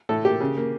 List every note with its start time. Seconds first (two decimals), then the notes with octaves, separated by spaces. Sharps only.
0.09 A2 A4
0.25 A#3 G4
0.41 C#3
0.57 A#3